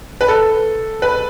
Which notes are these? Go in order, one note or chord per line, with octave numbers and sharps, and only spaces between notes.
B4
A4
B4